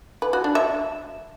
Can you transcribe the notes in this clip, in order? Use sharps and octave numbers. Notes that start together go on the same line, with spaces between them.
B4
F#4
D4
E5